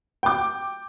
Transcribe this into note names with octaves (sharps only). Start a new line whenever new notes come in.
G5 D6